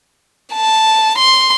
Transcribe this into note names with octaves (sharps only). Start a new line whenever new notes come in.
A5
C6